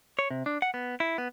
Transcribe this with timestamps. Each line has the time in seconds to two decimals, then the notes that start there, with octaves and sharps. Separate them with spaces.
0.19 C#5
0.30 C3
0.46 D4
0.62 F#5
0.74 B3
1.00 E4
1.18 B3